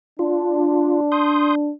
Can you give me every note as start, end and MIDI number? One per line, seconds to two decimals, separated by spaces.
0.19 1.70 62
0.19 1.01 65
1.12 1.55 84
1.12 1.55 87
1.12 1.55 91